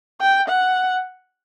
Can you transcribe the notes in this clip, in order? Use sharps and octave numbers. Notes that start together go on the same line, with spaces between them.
G5
F#5